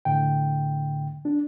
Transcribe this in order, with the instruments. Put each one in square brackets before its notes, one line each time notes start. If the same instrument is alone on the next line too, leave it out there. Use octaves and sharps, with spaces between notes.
[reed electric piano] A2 D3 G5
D4